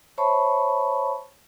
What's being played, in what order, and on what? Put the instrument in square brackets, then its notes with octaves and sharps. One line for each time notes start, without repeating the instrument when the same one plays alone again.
[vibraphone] C5 C#5 E5 A5 B5 C#6